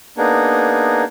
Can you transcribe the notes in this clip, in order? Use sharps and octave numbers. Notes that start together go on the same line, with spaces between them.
A#3 B3 D4 D#4 G#4